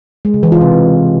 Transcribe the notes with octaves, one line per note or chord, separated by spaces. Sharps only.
G#3
C#3
E3
F4
C3